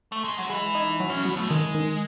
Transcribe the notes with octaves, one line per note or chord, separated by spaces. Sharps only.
A3
G#3
F#3
E3 G#3
D#4
F#3
C#4
F#3 B3
A3
D#3 G#3
D#3